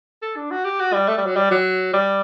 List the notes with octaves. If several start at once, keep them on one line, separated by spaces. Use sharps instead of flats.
A4
D4
F#4
G4
F#4
G3
A3
G3
F#3
G3
F#3
G3